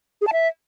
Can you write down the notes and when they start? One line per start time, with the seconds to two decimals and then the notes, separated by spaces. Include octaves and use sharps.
0.21 G#4
0.27 A5
0.33 E5